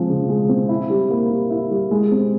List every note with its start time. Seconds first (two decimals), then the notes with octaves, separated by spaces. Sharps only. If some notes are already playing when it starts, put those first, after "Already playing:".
Already playing: F3 G#3 C4
0.09 C#3
0.29 G#3
0.49 C4
0.69 E4
0.90 G3
1.10 A#3
1.30 G3
1.50 E4
1.71 G3
1.91 G#3
2.12 C4